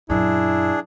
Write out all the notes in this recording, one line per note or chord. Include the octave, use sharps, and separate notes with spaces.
F#2 A#2 D4 E4 G#4